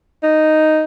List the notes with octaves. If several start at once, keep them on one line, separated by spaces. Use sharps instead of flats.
D#4